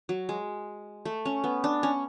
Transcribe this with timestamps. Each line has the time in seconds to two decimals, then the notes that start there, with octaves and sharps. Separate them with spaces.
0.09 F#3
0.29 G#3
1.05 A3
1.25 C#4
1.44 B3
1.64 D4
1.83 C#4